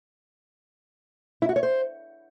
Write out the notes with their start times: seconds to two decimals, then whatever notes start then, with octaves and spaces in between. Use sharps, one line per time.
1.42 E4
1.49 F#4
1.56 C#5
1.63 C5